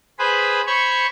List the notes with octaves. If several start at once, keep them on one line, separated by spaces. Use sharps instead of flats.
G#4 B4 C5 B5
C5 C#5 B5 C#6